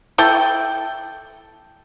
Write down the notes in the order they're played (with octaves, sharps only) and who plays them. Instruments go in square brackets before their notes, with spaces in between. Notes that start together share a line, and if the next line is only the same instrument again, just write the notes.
[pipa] E4 A4 G5